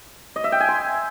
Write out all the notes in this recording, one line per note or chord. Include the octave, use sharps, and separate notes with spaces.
D#5
E5
G5
G#5
C6